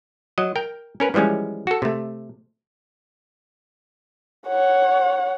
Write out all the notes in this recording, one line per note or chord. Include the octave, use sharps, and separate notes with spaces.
F#3 D#5
A#4 G5
C#4 A#4 B4
E3 F3 G3 G#3 C#4
F#4 A4
C3 A3
C#5 F#5